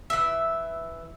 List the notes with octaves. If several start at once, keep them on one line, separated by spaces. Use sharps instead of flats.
E3 E5